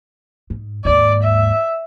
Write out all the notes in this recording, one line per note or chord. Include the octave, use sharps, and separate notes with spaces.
G#2
D#2 G#2 D5
E5